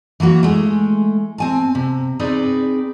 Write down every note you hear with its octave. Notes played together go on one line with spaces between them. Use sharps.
E3 F#3 A#3 F#4
G#3 A3
C4 G#5 A5
C3
C4 D#4 G#4 B4 D5